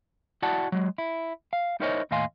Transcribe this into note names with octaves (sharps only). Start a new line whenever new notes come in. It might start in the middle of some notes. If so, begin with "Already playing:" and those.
E4 F#4 D5 F#5 A5
F#3 G#3
E4
F5
D#4 E4 A#4 C5 C#5 D#5
D#2 A2 D#5 F5 G#5 C6